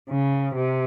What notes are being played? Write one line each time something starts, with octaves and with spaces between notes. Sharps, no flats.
C#3
C3